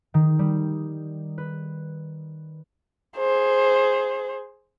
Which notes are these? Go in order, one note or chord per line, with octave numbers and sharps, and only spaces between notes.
D#3
G3
B4
G#4 C5